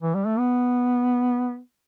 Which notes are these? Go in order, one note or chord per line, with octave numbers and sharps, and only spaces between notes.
E3
G3
A3
B3